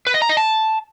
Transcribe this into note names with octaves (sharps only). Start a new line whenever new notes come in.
B4
D#5
A#5
D#5
A5